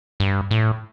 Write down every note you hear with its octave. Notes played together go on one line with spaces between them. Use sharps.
G2
A2